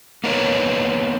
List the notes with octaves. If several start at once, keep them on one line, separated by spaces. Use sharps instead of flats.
A#3 B3 D#4 A#4 B4 C#5